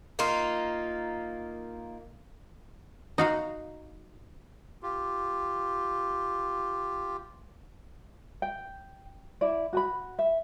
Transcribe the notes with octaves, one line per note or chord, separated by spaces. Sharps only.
A#3 D#4 F4
D#4 F#4 F5
F4 G4
G5
E4 D5
F#4 G#5 B5
E5